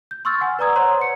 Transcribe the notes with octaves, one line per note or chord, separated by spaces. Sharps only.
G6
C6 C#6 E6 F6 A6
F#5 G#5
B4 D5 A#5 D#6 G#6
C5 C#5 F#5 A#5 C6
C#7